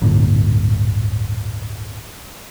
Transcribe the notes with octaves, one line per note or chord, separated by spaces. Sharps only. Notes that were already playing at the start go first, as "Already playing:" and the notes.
D1 G1 A#2